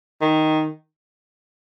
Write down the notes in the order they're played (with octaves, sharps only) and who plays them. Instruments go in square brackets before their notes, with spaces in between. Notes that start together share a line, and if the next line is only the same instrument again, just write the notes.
[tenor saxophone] D#3